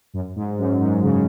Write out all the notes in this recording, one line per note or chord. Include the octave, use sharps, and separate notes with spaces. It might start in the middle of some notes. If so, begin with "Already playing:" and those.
F#2
G#2
F#2
G#2
C#3